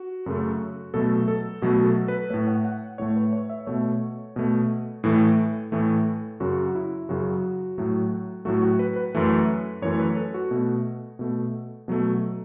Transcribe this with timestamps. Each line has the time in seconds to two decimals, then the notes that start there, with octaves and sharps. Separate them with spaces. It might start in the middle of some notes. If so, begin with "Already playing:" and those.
Already playing: F#4
0.26 F#2 C#3 A3
0.94 B2 F#3 A3 A4
1.28 A4
1.62 B2 F#3 A3 F#4
1.85 A4
2.08 B4
2.30 A2 A3 C#5
2.48 F#5
2.65 F#5
2.98 A2 A3 C#5
3.16 B4
3.33 C#5
3.50 E5
3.67 B2 A3 C#5
4.36 B2 A3
5.04 A2 E3 A3
5.72 A2 E3 A3
6.40 F#2 C#3 F#3 F#4
6.75 E4
7.09 F#2 C#3 F#3 F#4
7.78 A2 F#3 A3
8.45 A2 F#3 A3 F#4
8.62 F#4
8.79 B4
8.96 B4
9.15 F#2 E3 A3
9.82 F#2 E3 A3 C#5
9.99 B4
10.16 A4
10.34 F#4
10.51 B2 A3
11.19 B2 A3
11.88 B2 F#3 A3